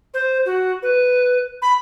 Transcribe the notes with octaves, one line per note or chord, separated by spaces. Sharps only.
C5
F#4
B4
B5